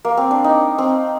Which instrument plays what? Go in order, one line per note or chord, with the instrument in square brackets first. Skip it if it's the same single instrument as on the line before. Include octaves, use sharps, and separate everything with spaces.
[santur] A#3
C4
D4
D#4
C4